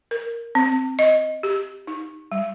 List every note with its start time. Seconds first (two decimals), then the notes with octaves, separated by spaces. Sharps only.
0.11 A#4
0.55 C4
0.99 D#5
1.43 G4
1.87 D#4
2.32 G3